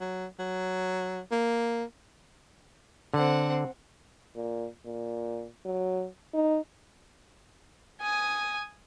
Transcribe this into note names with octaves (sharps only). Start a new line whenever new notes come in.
F#3
F#3
A#3
D3 C4 F#5
A#2
A#2
F#3
D#4
G#5 D#6